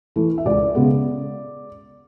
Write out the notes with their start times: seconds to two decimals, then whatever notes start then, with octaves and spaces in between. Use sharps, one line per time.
0.16 E3 A3
0.38 E5
0.46 C#2 D5
0.75 C#3 G#3 B3